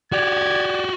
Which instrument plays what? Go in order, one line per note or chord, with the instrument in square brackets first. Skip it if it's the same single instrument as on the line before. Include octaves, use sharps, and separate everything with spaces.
[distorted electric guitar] F#4 G4 [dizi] D5 [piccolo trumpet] G#6